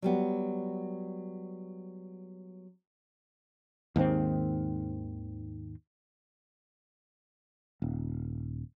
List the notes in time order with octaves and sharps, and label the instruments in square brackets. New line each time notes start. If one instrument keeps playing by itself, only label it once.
[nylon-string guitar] F#3 G3 B3
[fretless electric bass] D#2 G#2 D#3 C4
D#1